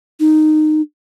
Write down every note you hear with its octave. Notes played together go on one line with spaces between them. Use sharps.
D#4